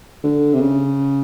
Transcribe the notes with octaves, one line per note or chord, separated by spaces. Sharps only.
D3
C3
C#3